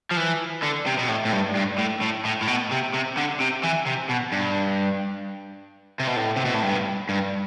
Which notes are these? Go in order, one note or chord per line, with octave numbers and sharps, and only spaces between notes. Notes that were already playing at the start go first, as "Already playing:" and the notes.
F3
E3
D3
C3
B2
A2
A2
G2
G2
A2
A2
A2
A2
B2
C3
C3
D3
C3
E3
C3
B2
G2
C3
B2
A2
C3
B2
A2
G2
G2